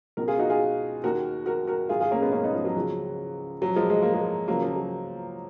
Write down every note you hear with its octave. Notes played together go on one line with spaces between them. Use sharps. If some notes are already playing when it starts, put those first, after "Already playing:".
C#2 B2 A#4
F4 G#4
D#4 F#4
F4 G#4
D#2 D#3 F#4 A#4
F#4 A#4
F#4 A#4
G#2 D#3 F4 G#4
F4 G#4
A#3 C#4
G#3 B3
A#3 C#4
B3 D#4
F3
F#3
C#2 C#3 F3
F#2 F3 F#3
F3 G#3
G#3
A#3
F3 G#3
C#2 C#3 F3 F#3 A#3
F3
F#3